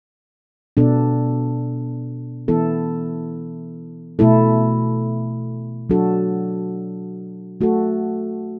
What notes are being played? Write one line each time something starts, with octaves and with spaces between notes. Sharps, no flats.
B2 B3 D4 A4
E3 B3 E4 A4
B2 A3 E4 A4
F#3 D4 F#4 A4
A3 F#4 A4